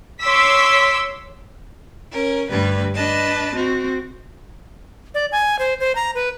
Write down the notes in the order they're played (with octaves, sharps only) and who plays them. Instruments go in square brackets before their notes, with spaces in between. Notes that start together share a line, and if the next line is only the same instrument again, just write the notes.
[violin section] C#5 C6 D6 E6 B6
[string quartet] C#4 A#4
D2 G2 G3 B4
D4 B4 D#5 A5
C4 F#4
[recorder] D5
G#5
C5
C5
A#5
B4